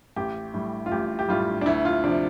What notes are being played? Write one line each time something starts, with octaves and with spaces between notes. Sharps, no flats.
A1 G4
A2 G3
F4
A1 G4
G4
A2 G3 F4
D4
D2 E4
F4
C3 F3 D4